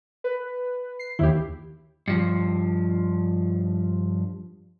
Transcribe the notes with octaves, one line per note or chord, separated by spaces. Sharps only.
B4
C7
D#2 D#3 E4 G4
G2 F3